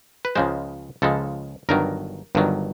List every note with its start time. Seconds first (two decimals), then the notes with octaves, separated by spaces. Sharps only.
0.25 B4
0.35 C#2 C#3 F3 G#3 C5
1.02 C#2 C#3 F3 G#3 A4
1.69 G1 G2 D#3 F#3 A#4
2.35 G1 G2 D#3 F#3